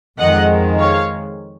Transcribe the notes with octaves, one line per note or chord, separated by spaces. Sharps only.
F2 D#3 G#3 D#5 F#5
C#5 F5